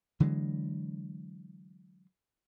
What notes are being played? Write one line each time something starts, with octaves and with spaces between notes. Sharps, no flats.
D3 E3 F#3 G#3